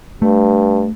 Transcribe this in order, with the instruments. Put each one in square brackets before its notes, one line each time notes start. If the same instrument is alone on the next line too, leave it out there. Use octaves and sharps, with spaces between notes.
[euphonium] G2 [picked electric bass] A3